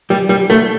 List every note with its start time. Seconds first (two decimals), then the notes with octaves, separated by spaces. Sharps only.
0.10 G3
0.29 G3
0.50 A3